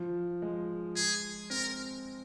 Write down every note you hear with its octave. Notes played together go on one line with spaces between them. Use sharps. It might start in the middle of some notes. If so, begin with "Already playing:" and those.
Already playing: F3
G#3
G#4
C4 A#4